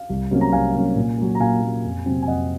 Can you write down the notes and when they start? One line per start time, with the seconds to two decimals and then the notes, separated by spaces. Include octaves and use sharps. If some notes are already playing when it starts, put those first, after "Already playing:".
Already playing: F5
0.10 C2
0.31 C3 F#3 A#3 C#4
0.41 A#5
0.53 C2 F5 G#5
0.74 C3 F#3 A#3 C#4
0.96 A#2
1.18 F#3 A#3
1.35 A#5
1.40 A#2 F5 G#5
1.62 F#3 A#3
1.85 F2
2.06 C3 F#3 C4
2.23 G#5
2.27 F2 D#5 F#5